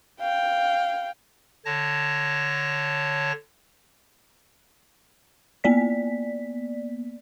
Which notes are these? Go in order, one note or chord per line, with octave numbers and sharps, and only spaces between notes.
F5 G5
D3 C#5 A5 A#6
A#3 B3 D5 B6